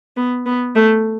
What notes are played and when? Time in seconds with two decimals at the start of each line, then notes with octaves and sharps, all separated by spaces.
0.17 B3
0.46 B3
0.75 A3